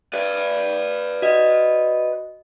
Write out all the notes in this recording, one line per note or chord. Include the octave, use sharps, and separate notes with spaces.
B4 D5
F#4 D#5